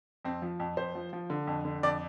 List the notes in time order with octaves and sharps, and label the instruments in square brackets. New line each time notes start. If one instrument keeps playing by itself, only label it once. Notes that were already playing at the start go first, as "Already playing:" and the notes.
[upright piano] F2 C4
F3
F2
F2 C5
F3
F3
D3
F2
D3
F2 D5